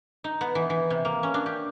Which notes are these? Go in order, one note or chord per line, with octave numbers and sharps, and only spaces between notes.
D#4
B3
E3
E3
C3
A#3
C#4
D4
G4